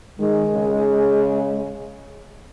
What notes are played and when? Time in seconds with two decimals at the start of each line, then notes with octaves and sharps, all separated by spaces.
0.18 D#3 G#3
0.53 C#3